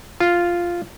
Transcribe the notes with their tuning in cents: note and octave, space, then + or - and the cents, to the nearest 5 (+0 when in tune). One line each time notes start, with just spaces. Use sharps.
F4 -5